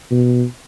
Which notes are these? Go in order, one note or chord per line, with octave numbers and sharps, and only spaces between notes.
B2